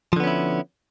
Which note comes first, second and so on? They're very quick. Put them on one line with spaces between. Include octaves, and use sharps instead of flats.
F3 D3 B3 C#4 E4